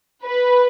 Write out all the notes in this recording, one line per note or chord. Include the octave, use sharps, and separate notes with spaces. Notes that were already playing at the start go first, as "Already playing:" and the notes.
B4